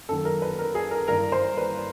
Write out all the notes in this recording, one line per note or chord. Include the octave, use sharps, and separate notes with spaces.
F#2 D#3 F#3 A4
A#4
B4
A#4
G#4
A#4
G2 E3 A#4
C5
B4